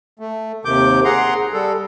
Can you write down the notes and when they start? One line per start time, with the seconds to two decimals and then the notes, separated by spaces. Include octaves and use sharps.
0.19 A3
0.65 D#2 C3 D#3 D6 G6
1.04 G#4 F#5 A#5 C6
1.53 G3 A4